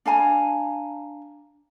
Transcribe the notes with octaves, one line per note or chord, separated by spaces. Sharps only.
D4 F5 G#5 A#5